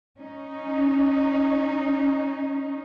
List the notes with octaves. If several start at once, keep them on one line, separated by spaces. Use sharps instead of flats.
C#4 D#4